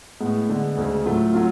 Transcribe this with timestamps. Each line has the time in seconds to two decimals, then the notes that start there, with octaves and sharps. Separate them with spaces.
0.20 A2 G#3 B3
0.49 D3 G#3 B3
0.77 D2 C#3 G#3
1.06 A2 F#3 A3 F4
1.33 F#3 A3 F4